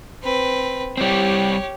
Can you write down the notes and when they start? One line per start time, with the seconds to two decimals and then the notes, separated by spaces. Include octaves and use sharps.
0.23 C4 B4
0.97 G3 C4 G4 C#5